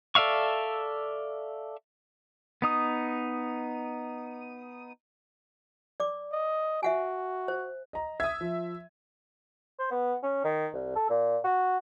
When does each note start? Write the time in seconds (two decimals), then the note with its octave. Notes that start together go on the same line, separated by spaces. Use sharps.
0.15 A4 D5 E5 F5 C#6
2.62 B3 D#4 D#6
6.00 D5 D6
6.32 D#5
6.83 F#4 E5 F#5 G#5
7.48 C5
7.93 D#5 A#5
8.20 E5 D#6 G#6
8.41 F3
9.79 C5
9.91 B3
10.23 C#4
10.44 D#3
10.73 C2
10.95 A4
11.10 A#2
11.44 F#4